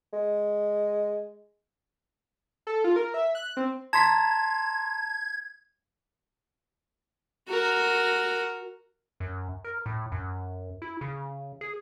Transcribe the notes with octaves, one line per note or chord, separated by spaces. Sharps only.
G#3
A4
F4
A#4
E5
F#6
C4
A5 A#5 C6 G#6 B6
F#4 A#4
F#2
A#4
A2
F#2
E4
C#3
G#4